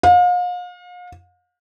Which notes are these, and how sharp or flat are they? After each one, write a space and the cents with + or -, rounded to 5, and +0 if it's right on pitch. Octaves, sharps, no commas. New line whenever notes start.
F5 +40